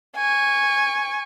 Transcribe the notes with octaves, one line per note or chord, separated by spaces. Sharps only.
G#5 C#6